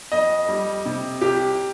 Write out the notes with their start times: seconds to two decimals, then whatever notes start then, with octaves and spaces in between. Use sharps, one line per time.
0.12 F2 D#5
0.48 G3
0.85 C3
1.21 C2 G4